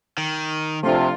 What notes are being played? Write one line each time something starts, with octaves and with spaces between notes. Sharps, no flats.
D#3
C3 F3 A3 D4 F4